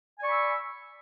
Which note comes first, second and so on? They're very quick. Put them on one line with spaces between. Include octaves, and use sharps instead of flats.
G#5 D5 C#6 B5 E6